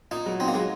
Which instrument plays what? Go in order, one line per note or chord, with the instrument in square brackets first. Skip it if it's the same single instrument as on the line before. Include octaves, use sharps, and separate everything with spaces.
[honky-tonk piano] A#2 [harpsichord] D#4
[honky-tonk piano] F#3
[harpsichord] C4 [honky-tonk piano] D#4
[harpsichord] A#3
[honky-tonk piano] F#3 [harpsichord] G#3